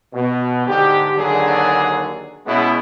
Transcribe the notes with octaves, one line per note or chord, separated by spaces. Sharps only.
B2
G#2 D3 G4
D#2 D3 F#3 D4 G#4
B2 G#3 B3 C#4 E4